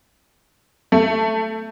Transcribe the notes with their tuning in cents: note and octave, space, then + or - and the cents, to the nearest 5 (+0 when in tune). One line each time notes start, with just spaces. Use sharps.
A3 +10